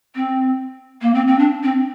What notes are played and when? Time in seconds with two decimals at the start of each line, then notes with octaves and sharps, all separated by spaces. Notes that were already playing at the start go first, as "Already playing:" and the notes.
0.15 C4
1.02 A#3
1.14 C4
1.27 C4
1.39 D4
1.63 C4